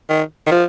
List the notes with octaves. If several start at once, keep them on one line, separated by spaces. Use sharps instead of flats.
D#3
D#3
F3